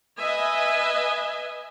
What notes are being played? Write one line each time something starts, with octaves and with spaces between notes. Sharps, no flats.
B4 D#5 E5 G#5